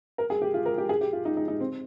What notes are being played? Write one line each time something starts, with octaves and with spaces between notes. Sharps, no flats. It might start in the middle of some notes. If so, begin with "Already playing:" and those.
A#4
G#4
G4
F4
A#4
G4
G#4
G4
F4
D#4
D#4
D#4
C4